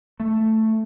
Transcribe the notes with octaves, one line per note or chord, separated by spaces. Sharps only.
A3